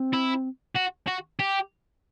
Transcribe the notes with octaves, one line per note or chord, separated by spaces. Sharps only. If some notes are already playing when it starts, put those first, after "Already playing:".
Already playing: C4
E4
F#4
F#4
G4